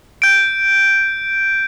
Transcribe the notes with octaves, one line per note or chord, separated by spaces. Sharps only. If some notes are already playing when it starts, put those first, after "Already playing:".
G6 D7